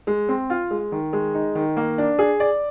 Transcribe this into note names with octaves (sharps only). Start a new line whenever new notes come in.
G#3
C4
F4
G#3
D#3
G#3
D#4
D#3
A#3
D4
G#4
D5